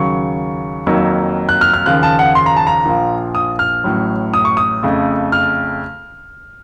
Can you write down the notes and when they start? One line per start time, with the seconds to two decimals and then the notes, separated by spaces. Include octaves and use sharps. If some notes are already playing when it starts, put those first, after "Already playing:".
Already playing: D#2 C#3 F#3 C#6
0.87 F2 D#3 F#3 A#3
1.49 F#6
1.61 F6
1.74 F6
1.86 D#2 C#3 F3 F#6
2.03 A5
2.19 F#5
2.35 C6
2.46 A#5
2.56 A5
2.67 A#5
2.85 A#1 A#2 F3
3.35 D#6
3.59 F6
3.84 A1 A2 F#3
4.34 D#6
4.45 C#6
4.57 D#6
4.83 F2 C#3 A3
5.32 F6